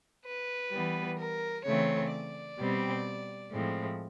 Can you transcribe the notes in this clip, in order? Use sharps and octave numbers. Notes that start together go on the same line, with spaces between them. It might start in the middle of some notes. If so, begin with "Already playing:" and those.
B4
E3 G3 B3
A#4
C#3 E3 A3 C4 C#5
D5
B2 G3 C4
A2 F3 G#3 C4